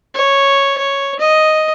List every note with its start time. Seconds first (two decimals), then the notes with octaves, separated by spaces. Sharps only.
0.14 C#5
0.78 C#5
1.19 D#5